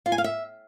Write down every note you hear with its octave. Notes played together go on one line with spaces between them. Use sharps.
F4
G#5
F5
E5